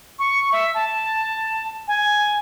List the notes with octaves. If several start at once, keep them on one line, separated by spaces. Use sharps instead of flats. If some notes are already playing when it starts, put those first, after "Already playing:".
C#6
E5
A5
G#5